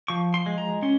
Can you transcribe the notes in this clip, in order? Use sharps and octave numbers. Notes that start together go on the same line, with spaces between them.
F3 C#6
C6
G#3
A#5
C#4 C6